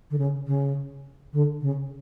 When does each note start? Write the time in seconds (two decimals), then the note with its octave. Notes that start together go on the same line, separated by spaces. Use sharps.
0.11 D3
0.18 C#3
0.47 C#3
1.33 D3
1.61 C#3